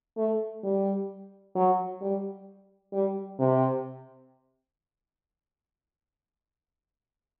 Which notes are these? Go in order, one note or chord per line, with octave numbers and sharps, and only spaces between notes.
A3
G3
F#3
G3
G3
C3